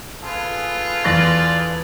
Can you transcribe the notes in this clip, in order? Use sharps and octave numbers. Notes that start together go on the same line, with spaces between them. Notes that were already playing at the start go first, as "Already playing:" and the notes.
F4 G#4 A4 B4
E2 D5 A6 A#6